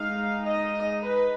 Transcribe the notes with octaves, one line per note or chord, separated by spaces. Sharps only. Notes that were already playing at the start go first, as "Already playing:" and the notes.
Already playing: G#3 D#4 F5
D#5
B4